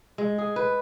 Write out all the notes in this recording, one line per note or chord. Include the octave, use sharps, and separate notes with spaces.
G#3
G#4
B4